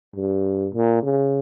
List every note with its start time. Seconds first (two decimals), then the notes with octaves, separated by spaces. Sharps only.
0.16 G2
0.74 A#2
1.03 C#3